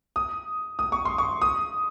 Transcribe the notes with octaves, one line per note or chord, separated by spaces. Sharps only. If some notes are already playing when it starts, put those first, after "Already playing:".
D#6
D#6
C#6
C6
C#6
D#6